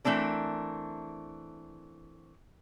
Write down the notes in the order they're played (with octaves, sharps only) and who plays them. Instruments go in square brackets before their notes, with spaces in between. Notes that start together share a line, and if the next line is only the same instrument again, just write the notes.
[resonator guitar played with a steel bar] E3 A3 C4 D4 A#4